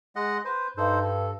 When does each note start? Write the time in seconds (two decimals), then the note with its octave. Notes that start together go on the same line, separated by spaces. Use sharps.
0.16 G#3 D#5 F#5
0.45 B4 C5
0.77 G2 D#4 A4 C5
1.02 A4